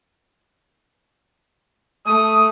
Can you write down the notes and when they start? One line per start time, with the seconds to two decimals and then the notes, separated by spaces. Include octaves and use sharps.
2.06 A3 D#6